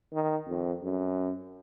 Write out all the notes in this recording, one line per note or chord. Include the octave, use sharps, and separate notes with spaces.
D#3
F2
F#2